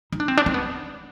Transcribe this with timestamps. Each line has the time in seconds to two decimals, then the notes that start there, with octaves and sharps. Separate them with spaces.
0.12 D#4
0.20 D4
0.28 C4
0.37 D4
0.46 C4
0.54 B3